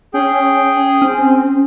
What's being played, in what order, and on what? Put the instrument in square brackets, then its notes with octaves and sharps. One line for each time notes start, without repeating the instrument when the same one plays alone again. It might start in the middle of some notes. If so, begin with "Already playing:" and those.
[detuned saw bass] C#4 [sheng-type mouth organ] G#4 G5
[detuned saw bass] C4 [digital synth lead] C#4